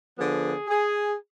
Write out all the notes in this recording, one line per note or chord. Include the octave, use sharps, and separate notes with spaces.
D3 F3 B3 G#4
G#4